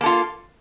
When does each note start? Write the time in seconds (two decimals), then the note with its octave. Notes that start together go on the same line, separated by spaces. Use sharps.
0.01 A#3
0.03 A4
0.06 F4